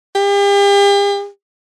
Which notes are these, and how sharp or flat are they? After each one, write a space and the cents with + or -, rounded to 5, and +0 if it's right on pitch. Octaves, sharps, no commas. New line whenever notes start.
G4 +40